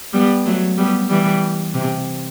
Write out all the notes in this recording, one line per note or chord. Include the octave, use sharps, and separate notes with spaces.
G3 B3
F#3 A3
G3 B3
E3 G3
C3